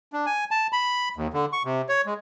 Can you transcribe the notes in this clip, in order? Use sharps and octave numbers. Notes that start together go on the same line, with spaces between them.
D4
G#5
A5
B5
D#2
D3
C#6
C3
C#5
G#3